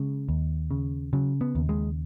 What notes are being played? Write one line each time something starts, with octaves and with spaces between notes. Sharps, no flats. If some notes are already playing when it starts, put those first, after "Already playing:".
Already playing: C#3 G#3
D#2
C#3
C#3 F#3
B3
D#2
G#3